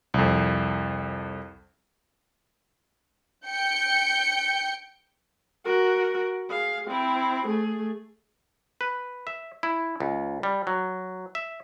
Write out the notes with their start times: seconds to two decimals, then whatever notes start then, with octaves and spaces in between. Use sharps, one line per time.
0.14 C2 F2
3.47 G5 G6 C#7
5.65 F#4 A#4
6.50 G#4 F5
6.87 C4 E4
7.46 A3 G#4
8.81 B4
9.27 E5
9.63 E4
10.00 C#2
10.43 G3
10.67 F#3
11.35 E5